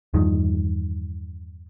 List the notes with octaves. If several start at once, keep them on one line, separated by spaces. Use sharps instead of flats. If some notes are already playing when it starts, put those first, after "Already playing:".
E2 G2 D#3 F3